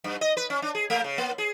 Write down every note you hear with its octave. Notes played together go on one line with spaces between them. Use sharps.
G2
D#5
B4
C#4
D4
G#4
A3
C#3
A#3
G#4